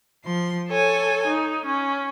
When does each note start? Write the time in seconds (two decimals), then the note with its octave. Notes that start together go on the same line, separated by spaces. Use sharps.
0.25 F3 C6
0.68 A4 C#5 G#5
1.27 D#4
1.67 C#4